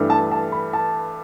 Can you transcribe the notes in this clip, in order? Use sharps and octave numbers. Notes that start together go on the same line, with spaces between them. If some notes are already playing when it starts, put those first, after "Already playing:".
Already playing: G2 E3 A3
A5
A5
B5
A5